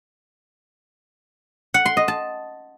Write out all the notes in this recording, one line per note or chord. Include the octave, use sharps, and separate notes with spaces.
F#5
C6
D#5
A5